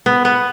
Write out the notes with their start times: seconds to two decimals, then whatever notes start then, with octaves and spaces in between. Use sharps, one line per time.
0.06 B3
0.25 B3